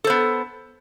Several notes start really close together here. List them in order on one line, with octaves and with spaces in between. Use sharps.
A4 C5 B3